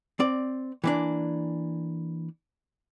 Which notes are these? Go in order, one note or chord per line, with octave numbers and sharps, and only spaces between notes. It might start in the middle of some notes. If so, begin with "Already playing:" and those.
C4 D5
E3 A#3 D4